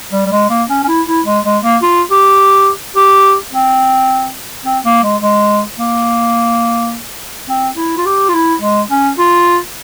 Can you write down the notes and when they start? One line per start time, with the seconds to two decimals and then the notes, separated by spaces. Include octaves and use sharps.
0.12 G3
0.26 G3
0.31 G#3
0.50 A#3
0.69 C#4
0.84 C#4
0.88 E4
1.07 E4
1.26 G#3
1.45 G#3
1.63 A#3
1.82 F4
2.11 G4
2.96 G4
3.52 C4
4.65 C4
4.85 A#3
5.03 G#3
5.22 G#3
5.79 A#3
7.49 C4
7.76 E4
7.97 F4
8.06 G4
8.29 F4
8.34 E4
8.61 G#3
8.90 C#4
9.18 F4